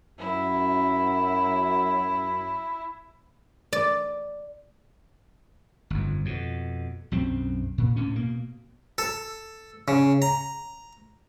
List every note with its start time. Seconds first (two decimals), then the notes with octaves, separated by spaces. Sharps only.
0.19 F#2 E4
3.73 D5
5.90 G1 F2
6.25 F2 B2
7.12 B1 F#2 C4
7.78 A#2
7.96 D2 A2 C#4
8.16 B2 A#3
8.98 A4
9.88 C#3
10.22 A#5